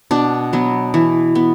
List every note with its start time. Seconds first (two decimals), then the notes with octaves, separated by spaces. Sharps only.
0.11 B2 D4
0.53 F#3 B3
0.94 E3
1.35 B3